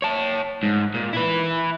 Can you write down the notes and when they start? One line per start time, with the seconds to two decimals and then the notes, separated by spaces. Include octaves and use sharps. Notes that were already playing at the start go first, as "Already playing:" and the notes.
0.02 C#5 A5
0.63 G#2
0.94 A#2
1.13 E4 B4